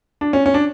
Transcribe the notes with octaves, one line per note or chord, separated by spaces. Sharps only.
D4
C#4
C#4
D4